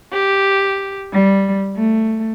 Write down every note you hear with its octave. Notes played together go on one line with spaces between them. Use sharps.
G4
G3
A3